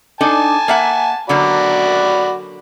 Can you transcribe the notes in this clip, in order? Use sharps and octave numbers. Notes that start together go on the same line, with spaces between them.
D4 D#4 A4 G#5 A5
A#3 E5 F#5
D3 F#3 A#3 F#4 D5 B5